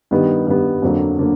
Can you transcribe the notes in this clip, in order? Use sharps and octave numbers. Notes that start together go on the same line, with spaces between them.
G2 D#3 G3 B3
G2 D#3 G3 B3
F2 D3 F#3 A#3
D3 F#3 A#3